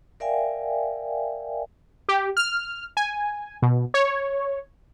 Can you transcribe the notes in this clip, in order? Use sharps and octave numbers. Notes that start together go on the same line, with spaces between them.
A#4 D5 E5 F5 G5 G#5
G4
F6
G#5
B2
C#5